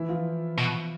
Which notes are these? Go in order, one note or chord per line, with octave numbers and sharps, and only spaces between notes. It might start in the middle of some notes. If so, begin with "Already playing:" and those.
Already playing: E3 E4
F3 F4
B2